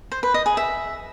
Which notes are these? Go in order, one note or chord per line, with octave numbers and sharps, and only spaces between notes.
C5
B4
D#5
G#4
E5